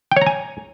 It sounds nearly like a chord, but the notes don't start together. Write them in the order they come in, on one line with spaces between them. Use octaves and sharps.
G5 C#5 A#5 G#5